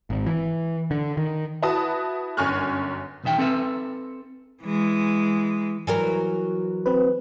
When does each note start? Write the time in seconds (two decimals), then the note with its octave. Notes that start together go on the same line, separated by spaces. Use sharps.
0.10 G#1
0.27 E3
0.91 D3
1.17 D#3
1.63 E4 F#4 B4 A5 D#6
2.37 G1 F#2 G#5 C#6 F6 F#6
3.24 B1 E2 D#3 E5 G5
3.38 C4 A4 B4 E5
4.63 E3 G#3
5.87 E3 F#3 A#4
6.86 C4 B4